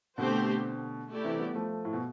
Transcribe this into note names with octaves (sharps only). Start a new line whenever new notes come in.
B2 D3 A3 C4 G4 C5
A3 E4 G4 D5
C3 E3
G3 B3
F3 A3
A2
B2